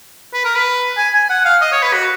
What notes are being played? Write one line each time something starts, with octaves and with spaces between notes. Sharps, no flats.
B4
A#4
B4
G#5
G#5
F#5
F5
D#5
C#5
B4
F#4